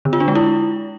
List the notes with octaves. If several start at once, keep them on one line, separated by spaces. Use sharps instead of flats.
D3
F4
D4
G#3
E4